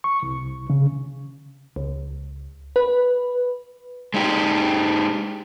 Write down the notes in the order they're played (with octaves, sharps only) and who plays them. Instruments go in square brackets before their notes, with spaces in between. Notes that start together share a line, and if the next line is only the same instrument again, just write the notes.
[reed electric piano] C#6
C2
C#3
[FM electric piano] C#2
B4
[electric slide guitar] G#3 D#4 G4